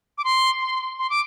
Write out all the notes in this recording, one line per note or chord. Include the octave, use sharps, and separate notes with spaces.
D6
C6
C6
C6
D6